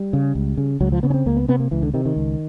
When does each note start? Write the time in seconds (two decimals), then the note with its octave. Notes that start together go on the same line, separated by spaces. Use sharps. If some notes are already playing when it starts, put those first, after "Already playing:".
Already playing: G3
0.13 C#3
0.35 C#2
0.57 C#3
0.81 C#2 F#3
0.92 F3
1.03 C#3 B3
1.10 C#4
1.14 C4
1.26 C#2 A#3
1.37 B3
1.48 C3 B3
1.60 A#3
1.71 C#2 E3
1.83 D3
1.94 C3 D#3
2.06 D#3
2.16 C#2